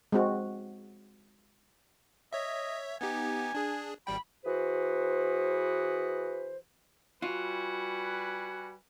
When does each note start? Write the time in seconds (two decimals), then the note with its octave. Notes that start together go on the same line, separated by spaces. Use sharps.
0.12 G#3 C4 F#4
2.33 C#5 D#5 E5
3.01 B3 D#4 G4 G#5
3.55 D4 G#4
4.07 G#1 G3 G5 B5
4.45 E3 F#4 G#4 B4 C5
7.22 G3 F4 F#4 B4 G#5